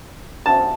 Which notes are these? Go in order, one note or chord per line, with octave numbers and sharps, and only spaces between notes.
A5